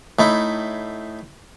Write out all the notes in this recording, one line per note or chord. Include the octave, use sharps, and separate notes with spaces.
A2 D#4 E4